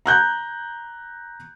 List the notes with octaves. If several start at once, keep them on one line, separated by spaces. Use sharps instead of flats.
A#5 F#6 G6